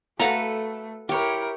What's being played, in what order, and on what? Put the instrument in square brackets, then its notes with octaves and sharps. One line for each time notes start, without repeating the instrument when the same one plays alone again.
[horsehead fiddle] A3 [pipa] F#4 F5 A#5 [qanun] A4 B4 F#5
[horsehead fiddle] E4 A#4 [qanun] G4 C#5